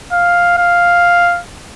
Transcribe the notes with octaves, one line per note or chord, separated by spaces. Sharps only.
F5
F5